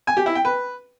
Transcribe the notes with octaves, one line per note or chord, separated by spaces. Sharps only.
G#5
G4
E4
G5
B4